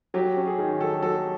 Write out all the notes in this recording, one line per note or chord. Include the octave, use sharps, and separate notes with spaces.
F#3 G4
C#4
G#4
D#3
F#3 A4
F#3 A4